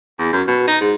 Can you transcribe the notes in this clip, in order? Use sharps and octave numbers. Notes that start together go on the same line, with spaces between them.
E2
F#2
B2
D#4
G#2